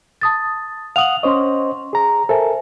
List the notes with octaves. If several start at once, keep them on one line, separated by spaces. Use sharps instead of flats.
A5 D#6 A6
F5 F#5 D#6 F7 F#7
C#4 C5 D#5 C6 C#6
G#4 A#5
A4 A#4 C5 E5 G#5